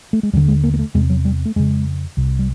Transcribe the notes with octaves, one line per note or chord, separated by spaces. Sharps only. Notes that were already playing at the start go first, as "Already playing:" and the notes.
A3
G#3
D#2 D3 G3
G#3
A#3
A#3
A3
E2 C3 G#3
F#3
G3
A3
F2 C#3 G#3
C2 C3
G3